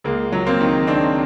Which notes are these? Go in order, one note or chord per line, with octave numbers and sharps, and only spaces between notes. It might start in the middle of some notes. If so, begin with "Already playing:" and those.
C#2 G#3 A#3
F#3
A#3 C4
D#3
D#3 C4 D4